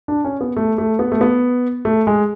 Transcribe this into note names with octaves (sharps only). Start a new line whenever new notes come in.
D4
C#4
B3
A3
A3
B3
A3
B3
A3
G#3